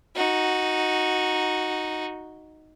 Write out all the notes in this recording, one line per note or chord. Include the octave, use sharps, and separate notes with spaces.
D#4 F#4